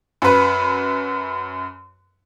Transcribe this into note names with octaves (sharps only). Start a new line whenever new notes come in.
F#2 B4